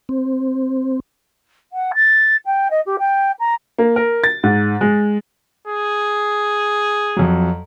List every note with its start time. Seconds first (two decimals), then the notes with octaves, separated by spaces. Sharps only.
0.09 C4
1.72 F#5
1.94 A6
2.45 G5
2.70 D#5
2.86 G4
2.99 G5
3.39 A#5
3.78 A#3
3.96 A#4
4.24 A6
4.43 G#2
4.81 G#3
5.68 G#4
7.17 F2 F#3